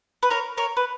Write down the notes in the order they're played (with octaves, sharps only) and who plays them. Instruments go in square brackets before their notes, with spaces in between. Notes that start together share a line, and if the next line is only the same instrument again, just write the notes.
[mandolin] B4
A#4 C#5
A#4 C#5
B4